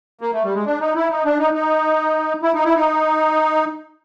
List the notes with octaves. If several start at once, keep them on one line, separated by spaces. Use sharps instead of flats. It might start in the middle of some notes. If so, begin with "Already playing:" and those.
A#3
A3
G3
G#3
D4
D#4
E4
D#4
D4
D#4
D#4
E4
D#4
E4
D#4